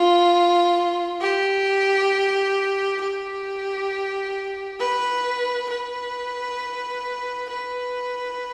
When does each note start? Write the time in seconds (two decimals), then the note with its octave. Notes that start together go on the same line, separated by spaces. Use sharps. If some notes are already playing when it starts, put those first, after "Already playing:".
Already playing: F4
1.21 G4
3.01 G4
4.80 B4
5.69 B4
7.49 B4